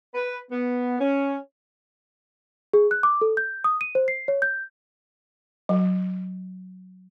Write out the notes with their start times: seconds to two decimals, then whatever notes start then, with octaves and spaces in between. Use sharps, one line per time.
0.15 B4
0.51 B3
0.99 C#4
2.73 G#4
2.91 F#6
3.03 D6
3.21 A4
3.37 G6
3.64 D#6
3.81 D#7
3.95 C5
4.08 C7
4.28 C#5
4.42 G6
5.69 F#3